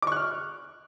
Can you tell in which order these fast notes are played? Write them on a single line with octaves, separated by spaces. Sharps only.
D6 C#6 F#6 F6